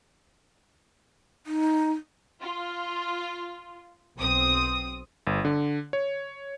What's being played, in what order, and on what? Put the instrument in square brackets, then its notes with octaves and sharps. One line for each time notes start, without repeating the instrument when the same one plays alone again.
[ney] D#4
[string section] F4
B1 C4 D#6
[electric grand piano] G1
D3
C#5